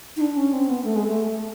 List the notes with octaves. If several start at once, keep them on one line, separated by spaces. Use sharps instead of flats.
D#4
D4
C#4
C4
B3
A3
G#3
A3